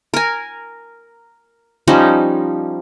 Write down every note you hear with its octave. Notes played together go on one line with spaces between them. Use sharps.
A#4 G#5
F3 G3 C#4 D#4